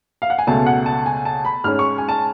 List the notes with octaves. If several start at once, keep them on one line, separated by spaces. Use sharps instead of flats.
F5
F#5
G#5
C#2 B2 A3 A5
F#5
A5
G#5
A5
B5
G#2 G#3 C#4 F6
C#6
G#5
A5